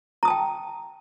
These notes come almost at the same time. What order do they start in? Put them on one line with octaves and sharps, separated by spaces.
A#5 D#6 A5 G5